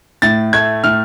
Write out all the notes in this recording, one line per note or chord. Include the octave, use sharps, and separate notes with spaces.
A2 A6
A3 G#6
A2 F6